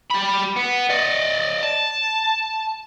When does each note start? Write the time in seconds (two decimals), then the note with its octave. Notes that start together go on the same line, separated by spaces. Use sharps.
0.10 G4 B5
0.56 B3
0.90 D5 D#5
1.63 A5